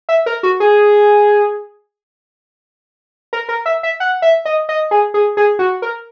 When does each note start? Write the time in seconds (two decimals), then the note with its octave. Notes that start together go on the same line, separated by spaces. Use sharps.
0.09 E5
0.26 A#4
0.43 F#4
0.60 G#4
3.33 A#4
3.49 A#4
3.66 E5
3.83 E5
4.00 F#5
4.22 E5
4.46 D#5
4.69 D#5
4.91 G#4
5.14 G#4
5.37 G#4
5.59 F#4
5.82 A#4